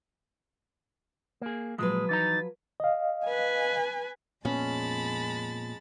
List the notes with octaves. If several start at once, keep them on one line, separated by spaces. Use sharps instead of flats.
A#3 G#4
A#2 F3 F#3 G#3 B4
E3 D#4 A#5 A6
D#5 F5
B4 G#5
F2 A#2 G#3 B3 C#4 A5 B5 A6